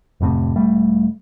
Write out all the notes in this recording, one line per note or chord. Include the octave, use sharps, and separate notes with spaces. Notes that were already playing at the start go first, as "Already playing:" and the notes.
D1 F2 A2 C3
E1 G3 A3